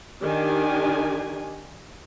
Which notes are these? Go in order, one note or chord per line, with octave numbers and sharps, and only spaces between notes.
D#3 D4 G4 G#5